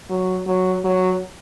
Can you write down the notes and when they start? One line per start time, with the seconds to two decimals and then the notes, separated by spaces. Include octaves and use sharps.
0.10 F#3
0.47 F#3
0.84 F#3